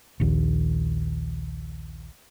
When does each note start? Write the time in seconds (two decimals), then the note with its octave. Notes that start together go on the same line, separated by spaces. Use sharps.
0.20 A#1 D#2